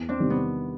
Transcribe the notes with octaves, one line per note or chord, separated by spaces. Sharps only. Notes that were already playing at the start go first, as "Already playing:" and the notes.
Already playing: E2
C4 D4
C3 D#3 G3
B3